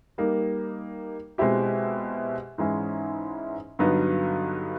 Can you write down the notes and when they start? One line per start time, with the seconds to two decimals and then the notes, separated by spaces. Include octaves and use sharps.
0.18 G3 A#3 D#4
1.38 B2 G#3 C4 E4 G4
2.58 G#2 E3 G#3 C#4 E4
3.79 G2 D3 F#3 B3 D#4